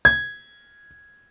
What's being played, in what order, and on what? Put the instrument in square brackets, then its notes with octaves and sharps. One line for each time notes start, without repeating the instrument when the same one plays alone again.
[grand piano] G#6